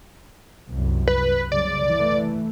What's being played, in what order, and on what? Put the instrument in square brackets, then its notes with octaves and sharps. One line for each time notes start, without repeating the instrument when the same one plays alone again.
[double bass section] C2 F#2 C3
[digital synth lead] B4
[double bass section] F#1 C2 C#3 [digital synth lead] D5
[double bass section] E3 A3